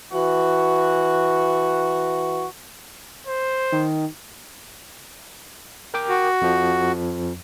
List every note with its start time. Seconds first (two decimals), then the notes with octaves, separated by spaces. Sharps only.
0.12 E3 F#4
3.27 C5
3.72 D#3
5.94 A#4 G5 D6
6.09 F#4
6.42 F2 F3